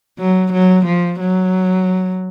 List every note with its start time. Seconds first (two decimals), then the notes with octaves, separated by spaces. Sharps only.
0.19 F#3
0.53 F#3
0.86 F3
1.20 F#3